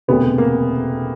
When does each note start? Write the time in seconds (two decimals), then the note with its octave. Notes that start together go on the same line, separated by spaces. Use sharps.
0.08 E1 D2 C3 B3
0.38 A#3